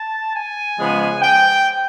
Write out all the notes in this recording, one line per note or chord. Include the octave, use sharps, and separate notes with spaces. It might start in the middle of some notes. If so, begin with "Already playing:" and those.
Already playing: A5
G#5
C#3 F3 G#3 B3
G5